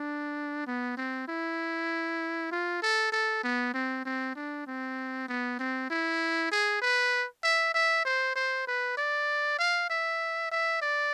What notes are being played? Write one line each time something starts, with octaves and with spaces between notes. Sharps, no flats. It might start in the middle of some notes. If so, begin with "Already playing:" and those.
Already playing: D4
B3
C4
E4
F4
A4
A4
B3
C4
C4
D4
C4
B3
C4
E4
G#4
B4
E5
E5
C5
C5
B4
D5
F5
E5
E5
D5